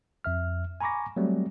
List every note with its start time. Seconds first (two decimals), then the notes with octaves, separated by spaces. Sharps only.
0.24 F2 E5 F6
0.81 G#5 A#5 B5 C#6 D6 A#6
1.17 F#3 G3 A3 C4